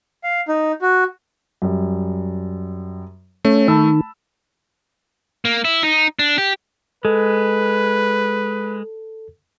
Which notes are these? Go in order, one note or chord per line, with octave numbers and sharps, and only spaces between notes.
F5
D#4
F#4
F#2 G3
A3 C#4
D#3 A5 B5 E6
A#3
E4
D#4
D4
G4
G#3 A4 B4